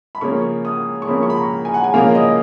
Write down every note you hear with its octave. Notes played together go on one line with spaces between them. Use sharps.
B5
C#3 F3 A#3 C#4 C#6
D#6
C#6
C#3 F3 A#3 C#4 B5
C#6
B5
A#5
G#5
F#5
G#5
C#3 F3 A#3 C#4 F5
D#5